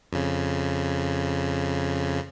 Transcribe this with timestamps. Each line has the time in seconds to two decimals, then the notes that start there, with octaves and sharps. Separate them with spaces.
0.13 F2 C#3